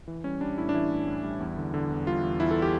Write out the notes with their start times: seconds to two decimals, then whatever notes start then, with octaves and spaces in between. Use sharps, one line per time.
0.08 E3
0.24 G3 C#4
0.41 G3 D4
0.58 A2 E4
0.69 D4
0.74 E3 E4
0.91 A2
1.07 A2
1.24 G3
1.40 E2
1.57 D3
1.74 D3
1.90 E2
2.07 G3 F4
2.23 E2
2.40 E2 E4
2.51 A4
2.62 G4